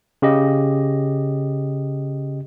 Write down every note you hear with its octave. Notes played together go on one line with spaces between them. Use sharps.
C#3 G4 D#5